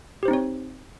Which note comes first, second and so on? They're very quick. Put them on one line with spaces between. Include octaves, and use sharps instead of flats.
G4 C5 D#4 C4 C#5